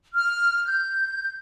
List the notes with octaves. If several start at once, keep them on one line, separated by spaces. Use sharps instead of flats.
F6
G6